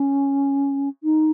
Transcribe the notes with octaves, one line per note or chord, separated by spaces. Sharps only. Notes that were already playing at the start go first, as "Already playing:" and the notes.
Already playing: C#4
D#4